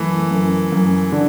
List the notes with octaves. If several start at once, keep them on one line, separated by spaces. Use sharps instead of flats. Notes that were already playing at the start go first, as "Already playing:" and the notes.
Already playing: F#2 E3 A3
F#2
F#2
D3